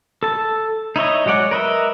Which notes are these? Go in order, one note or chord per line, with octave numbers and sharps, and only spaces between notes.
A4 A5
D#4 E4 C#5 D#5
F#3 G#3 C#5 D5 F#5
A#4 B4 D#5 E5